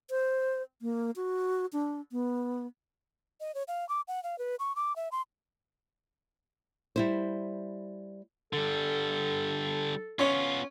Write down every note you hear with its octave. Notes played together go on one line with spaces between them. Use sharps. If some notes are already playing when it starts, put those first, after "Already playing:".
C5
A#3
F#4
D4
B3
D#5
C#5
F5
D6
F#5
F5
B4
C#6
D6
E5
C6
G3 E4 C5
D3 G3 A4
B3 C#4 F4 C#5